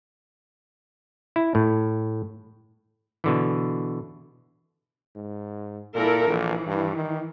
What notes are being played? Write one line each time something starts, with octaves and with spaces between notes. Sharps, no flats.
E4
A2
B2 D3 E3
G#2
A#2 E4 A4 A#4
A#1 E3
G2
D#3